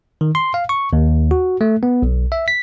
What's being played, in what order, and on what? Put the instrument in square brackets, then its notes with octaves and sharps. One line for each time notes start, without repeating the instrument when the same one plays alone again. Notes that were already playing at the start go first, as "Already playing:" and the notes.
[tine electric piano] D#3
C6
F5
C#6
D#2
F#4
A3
B3
B1
E5
B6